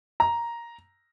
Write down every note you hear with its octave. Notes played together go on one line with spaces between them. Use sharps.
A#5